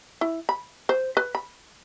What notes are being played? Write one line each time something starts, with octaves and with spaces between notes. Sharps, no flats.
E4
B5
C5
B4
B5